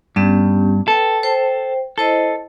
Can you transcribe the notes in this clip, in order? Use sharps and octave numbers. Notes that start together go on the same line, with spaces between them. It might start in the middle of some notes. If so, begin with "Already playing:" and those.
G2 B3 C#4 G4
A4 B4 G5
C5 G5
E4 A4 C5 D#5